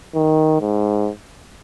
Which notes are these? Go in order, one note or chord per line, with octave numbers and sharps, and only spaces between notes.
D#3
G#2